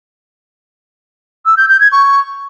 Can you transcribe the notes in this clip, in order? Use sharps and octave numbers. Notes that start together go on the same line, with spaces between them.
E6
G6
G6
G#6
C#6